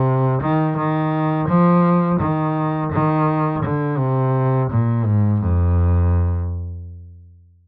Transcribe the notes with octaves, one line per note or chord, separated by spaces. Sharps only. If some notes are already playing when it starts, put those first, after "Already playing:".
Already playing: C3
D#3
D#3
F3
D#3
D#3
D3
C3
A#2
G#2
F2